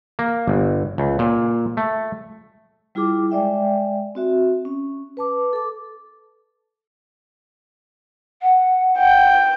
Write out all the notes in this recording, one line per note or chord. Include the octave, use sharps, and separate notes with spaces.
A#3
G1
C#2
A#2
A3
G3 E4 F4 G#4 D6
G#3 D5 E5 G5
C4 F#4 E5
C#4
B4 A5 D6
A4 D6
F#5
G5